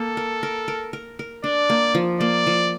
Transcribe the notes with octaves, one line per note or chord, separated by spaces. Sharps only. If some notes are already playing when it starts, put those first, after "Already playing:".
Already playing: A#3 A4
A#4
A#4
A#4
A#4
A#4
D4 D5
A#3
F3
A#3 D5
F3